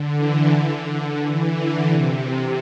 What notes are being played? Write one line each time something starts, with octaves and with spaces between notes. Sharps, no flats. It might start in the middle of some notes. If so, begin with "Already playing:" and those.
Already playing: D3
E3
D3
E3
D3
C3